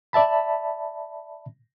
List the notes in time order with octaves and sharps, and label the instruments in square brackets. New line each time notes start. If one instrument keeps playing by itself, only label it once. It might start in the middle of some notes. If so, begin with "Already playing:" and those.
[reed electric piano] D5 E5 A5 B5